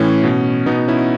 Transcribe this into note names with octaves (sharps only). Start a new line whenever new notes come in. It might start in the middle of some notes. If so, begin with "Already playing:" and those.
Already playing: A2 E3 C#4
B2
B2 B3 D#4
C#4 E4